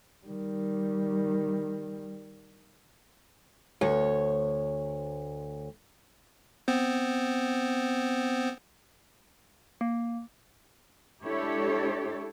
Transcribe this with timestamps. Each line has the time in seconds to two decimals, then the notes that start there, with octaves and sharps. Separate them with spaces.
0.27 D#3 G3
3.81 D2 C#5
6.68 B3 C4 C5
9.81 A#3
11.20 G#3 D4 E4 G4 A4 C#5